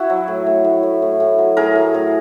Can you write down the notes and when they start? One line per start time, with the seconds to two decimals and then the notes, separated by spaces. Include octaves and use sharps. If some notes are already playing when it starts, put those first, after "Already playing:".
Already playing: E4 F#4
0.10 F#3
0.28 A2
0.46 A2
0.64 A2
0.83 A2
1.02 A2
1.20 A2
1.38 F#3
1.57 A2 G#4 A#4
1.75 A2
1.94 A2